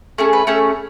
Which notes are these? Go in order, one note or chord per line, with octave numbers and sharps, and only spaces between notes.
A3 C#4 G#4 A4
B4
A3 C#4 G#4 A4